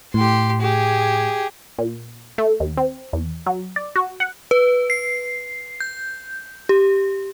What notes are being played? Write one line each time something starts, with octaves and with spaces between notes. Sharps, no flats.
A2 G4 C6
G4 G#4
A#2
A3
D#2
C4
E2
F#3
D5
F#4
F#5
B4
C7
G6
G4